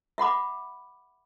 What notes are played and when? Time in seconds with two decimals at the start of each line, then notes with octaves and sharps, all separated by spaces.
0.18 E5 F#5 B5 D6